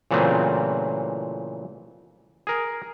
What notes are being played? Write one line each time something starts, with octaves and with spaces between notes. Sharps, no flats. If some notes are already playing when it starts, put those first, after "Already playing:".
A#2 C#3 E3 F#3 A3 C4
G#4 A#4